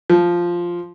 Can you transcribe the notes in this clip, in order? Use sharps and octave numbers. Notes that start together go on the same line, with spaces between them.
F3